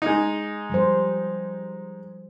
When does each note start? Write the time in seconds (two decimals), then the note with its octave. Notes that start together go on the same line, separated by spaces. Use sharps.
0.02 G#3 D#4
0.70 F3 G3 C5